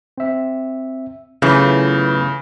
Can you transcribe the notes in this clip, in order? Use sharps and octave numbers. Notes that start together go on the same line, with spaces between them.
C4 E5
F#2 C#3 E3 A3 B3 E4 F4